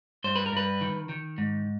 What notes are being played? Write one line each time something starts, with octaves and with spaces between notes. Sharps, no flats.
G2 C5
B4
A#4
G2 B4
D#3
D#3
G#2